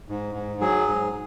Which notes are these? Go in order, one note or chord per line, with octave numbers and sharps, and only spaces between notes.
G#2
G#2
F#3 G#4
G#2